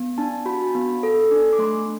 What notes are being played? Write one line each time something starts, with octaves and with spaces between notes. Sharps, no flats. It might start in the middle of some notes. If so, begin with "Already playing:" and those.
Already playing: B3
D4 A5
F#4 B5
B3
A4
D4
D6
A3 C6